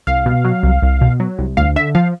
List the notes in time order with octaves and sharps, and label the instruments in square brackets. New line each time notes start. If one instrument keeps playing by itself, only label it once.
[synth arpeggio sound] C2 F5
B2
F#3
C2
C2
B2
F#3
C2
D2 F5
D3 E5
F3 F5